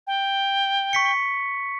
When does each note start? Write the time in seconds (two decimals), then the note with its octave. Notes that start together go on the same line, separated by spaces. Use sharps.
0.07 G5
0.93 C#6 B6 C#7